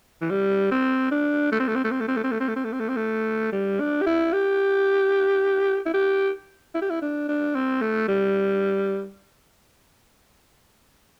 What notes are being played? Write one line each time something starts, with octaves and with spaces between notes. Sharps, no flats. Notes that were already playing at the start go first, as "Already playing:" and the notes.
E3
G3
C4
D4
A3
C4
A3
C4
A3
C4
A3
C4
A3
C4
A3
C4
A3
C4
A3
C4
A3
C4
A3
G3
D4
G4
E4
G4
E4
G4
E4
G4
E4
D4
D4
C4
A3
G3